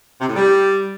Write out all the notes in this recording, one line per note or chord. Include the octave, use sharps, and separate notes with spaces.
C3
A2
G3